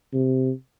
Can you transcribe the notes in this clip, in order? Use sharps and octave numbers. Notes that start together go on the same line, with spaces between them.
C3